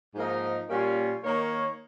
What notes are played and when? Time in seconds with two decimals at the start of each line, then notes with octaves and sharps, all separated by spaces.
0.15 G#2 F3 A#3 D#4 A#4
0.69 A#2 G3 A#3 C#4 F4
1.23 D#3 A#3 D#4 A#4 C#5